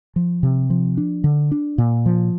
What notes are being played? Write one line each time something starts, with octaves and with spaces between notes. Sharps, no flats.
F3
C3
F3
D4
D3
D4
A#2
F3